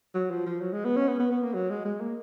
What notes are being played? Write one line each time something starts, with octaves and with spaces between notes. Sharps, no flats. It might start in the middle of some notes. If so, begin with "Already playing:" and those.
F#3
F3
F3
F#3
G#3
B3
C#4
B3
B3
B3
A#3
F#3
G#3
G#3
A#3